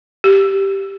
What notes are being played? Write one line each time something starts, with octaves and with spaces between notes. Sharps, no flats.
G4